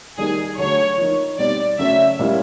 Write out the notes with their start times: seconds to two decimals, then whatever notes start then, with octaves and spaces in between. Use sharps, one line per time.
0.17 D#3 G3 A#3 D#4 G#4
0.58 D3 F#3 A3 C#5
0.98 F3 A#3 D#4
1.38 B2 G3 C4 D#4 D5
1.79 C#3 F#3 A3 C#4 E5
2.19 A#2 G3 A#3 C#4 E4